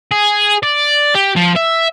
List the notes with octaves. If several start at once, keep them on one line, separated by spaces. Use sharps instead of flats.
G#4
D5
G4
F3
E5